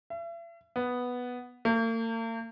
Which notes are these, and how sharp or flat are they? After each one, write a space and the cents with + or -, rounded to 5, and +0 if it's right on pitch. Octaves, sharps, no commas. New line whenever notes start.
E5 +40
B3 +0
A#3 -45